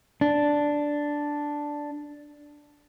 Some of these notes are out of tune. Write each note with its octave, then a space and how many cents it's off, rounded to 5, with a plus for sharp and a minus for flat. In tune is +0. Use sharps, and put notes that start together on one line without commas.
D4 +0